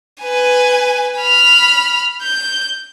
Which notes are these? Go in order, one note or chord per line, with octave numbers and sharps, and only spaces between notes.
B4 G#5
B5 F6
G6